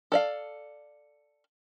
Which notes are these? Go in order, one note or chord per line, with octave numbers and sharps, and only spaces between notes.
A4 D5 F5